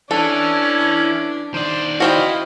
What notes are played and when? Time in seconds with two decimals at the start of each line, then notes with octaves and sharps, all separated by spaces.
0.11 E3 C#4 D4 A4
1.54 D#3 C5 D5
2.00 E4 F#4 C5 D#5 F5 G5